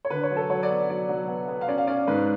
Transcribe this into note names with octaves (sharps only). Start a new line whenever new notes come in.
C#5
D3 B4
C#5
F#3
A4
F#3 C#5
D5
B3
F#3 D5
F#3
B3
B3
F5
C#4 D5
F5
C#4 D5
G#2 B4